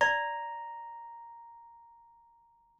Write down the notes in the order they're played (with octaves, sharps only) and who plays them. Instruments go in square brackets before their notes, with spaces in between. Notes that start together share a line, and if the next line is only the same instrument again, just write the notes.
[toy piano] D5 [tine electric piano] A#5